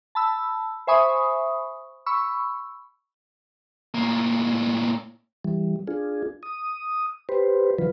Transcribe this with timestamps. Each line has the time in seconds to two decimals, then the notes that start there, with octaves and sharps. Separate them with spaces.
0.15 A5 B5 E6
0.87 C5 E5 G#5 B5 C#6 D#6
2.06 B5 C#6 E6
3.94 A2 A#3
5.44 E3 G3
5.87 D4 F4 G#4
6.43 D#6
7.29 G4 B4 C5
7.78 D3 E3 F#3 F4 B4